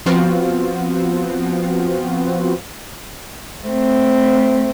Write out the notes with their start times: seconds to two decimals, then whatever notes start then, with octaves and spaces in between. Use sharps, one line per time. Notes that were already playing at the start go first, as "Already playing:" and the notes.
0.06 F3 B3 C4 F4 F#4
3.64 A3 C4